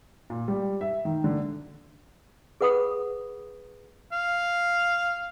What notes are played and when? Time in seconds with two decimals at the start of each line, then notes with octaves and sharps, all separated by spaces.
0.30 A#2
0.48 G3
0.81 E5
1.05 D#3
1.24 D3
2.61 G#4 B4 F#5 B5 D#6
4.12 F5